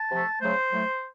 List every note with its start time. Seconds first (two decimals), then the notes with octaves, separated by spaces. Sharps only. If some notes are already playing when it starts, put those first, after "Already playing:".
Already playing: A5
0.11 C3 F3 A3
0.42 C#3 F#3 A3 C5
0.72 A2 F#3 A3